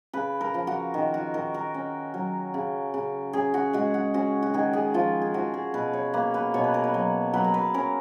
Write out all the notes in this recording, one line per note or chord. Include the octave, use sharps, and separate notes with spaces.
C#3 B4
A#4
F3
F#4
D#3
F#4
D#3 A#4
A#4
C#4
F#3
C#3
C#3
C#4 G#4
F#4
G#3 F#4
F#4
C#4 F#4
F#4
D#3 G#4
G#4
F3 F4
G#4
F3 F#4
G#4
B2 B4
C#5
A#3 B4
B4
B2 C#5
B4
A#4
B4
F#3
F#3 B4
A#4
B4
C#4 A#4